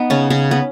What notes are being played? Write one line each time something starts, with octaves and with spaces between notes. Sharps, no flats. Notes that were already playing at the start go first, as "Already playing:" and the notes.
Already playing: B3 D#4
C#3 C#4
C#3 C#4
B3 B4